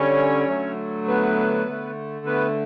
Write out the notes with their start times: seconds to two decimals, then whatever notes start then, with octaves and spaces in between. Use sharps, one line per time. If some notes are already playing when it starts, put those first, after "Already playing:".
Already playing: D3 G3 C#4 C#5
0.49 D3 F#3 A3
1.08 B3 B4
1.67 D3 A3
2.26 B3 B4